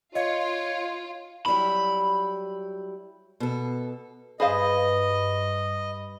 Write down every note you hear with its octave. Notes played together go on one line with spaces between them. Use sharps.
F4 C#5 D#5 F5
F#3 G3 E4 B5
B2 A4
G2 G#4 B4 C5 D#5 F5